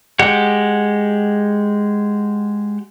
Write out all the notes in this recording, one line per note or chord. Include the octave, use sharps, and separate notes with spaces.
G#3 G4 F#5